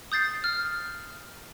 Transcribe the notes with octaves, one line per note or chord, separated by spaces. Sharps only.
D#6 G6 A6 C7
F6